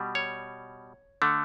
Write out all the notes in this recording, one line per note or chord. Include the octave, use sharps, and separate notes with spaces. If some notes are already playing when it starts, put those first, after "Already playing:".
Already playing: B2 G3
C#5
D3 A3